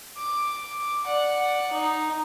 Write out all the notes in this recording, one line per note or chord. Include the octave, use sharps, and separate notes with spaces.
D6
D5 F#5
D#4